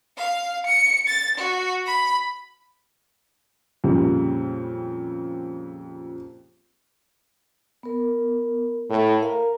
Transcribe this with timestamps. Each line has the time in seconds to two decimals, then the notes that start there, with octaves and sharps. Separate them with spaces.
0.17 F5
0.66 C#7
1.07 A6
1.37 F#4
1.86 B5
3.84 F2 A#2 C#3 G3 A#3
7.83 B3 A#4
8.90 A2
9.23 A#4 F5